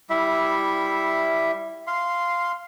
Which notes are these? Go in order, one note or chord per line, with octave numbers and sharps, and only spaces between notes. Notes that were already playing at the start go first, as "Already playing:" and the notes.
G3 E4 E5
F5 C6